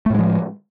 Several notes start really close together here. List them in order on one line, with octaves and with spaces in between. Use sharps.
A3 A2 G#3 F3